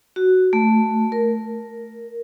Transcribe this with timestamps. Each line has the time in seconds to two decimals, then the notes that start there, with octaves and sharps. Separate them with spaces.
0.16 F#4
0.53 A3
1.12 A#4